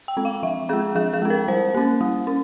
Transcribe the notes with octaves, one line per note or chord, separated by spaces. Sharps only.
G5
G#3 C4
F5
F3 E5
G#3 C4 G#4
F3 G#4
G#4
G#3 C4
A#4
G3 C5
A#3 C#4
G3
C#4